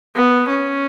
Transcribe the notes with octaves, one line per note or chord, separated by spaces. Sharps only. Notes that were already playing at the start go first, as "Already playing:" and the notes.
B3
C#4